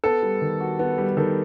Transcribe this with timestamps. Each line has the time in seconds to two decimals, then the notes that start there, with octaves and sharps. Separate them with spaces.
0.04 B3 A4
0.22 G3
0.41 D#3
0.60 F#4
0.79 B3
0.98 G3
1.17 D#3 A4